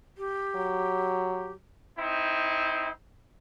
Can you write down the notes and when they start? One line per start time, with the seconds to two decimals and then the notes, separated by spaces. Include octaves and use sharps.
0.17 G4
0.56 F#3
1.98 C4 D#4 E4